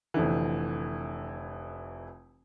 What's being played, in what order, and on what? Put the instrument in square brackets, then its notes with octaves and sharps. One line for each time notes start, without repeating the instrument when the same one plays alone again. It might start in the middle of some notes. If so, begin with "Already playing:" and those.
[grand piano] F1 D3 E3